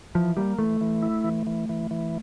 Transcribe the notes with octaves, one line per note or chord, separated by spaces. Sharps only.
E3 F3
G3 A#3
E3 A3
E3
E4
E3
E3
E3
E3